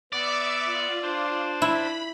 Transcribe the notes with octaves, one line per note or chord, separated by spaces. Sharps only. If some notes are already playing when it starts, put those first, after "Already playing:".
B3 D5 E5 D6 E6
F4
D4 C5
E4 B5